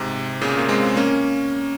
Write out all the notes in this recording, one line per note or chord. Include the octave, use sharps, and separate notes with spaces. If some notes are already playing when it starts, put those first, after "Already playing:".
Already playing: G#2 C3
A#2 C#3
A#3
G#3 C4
A#3 C#4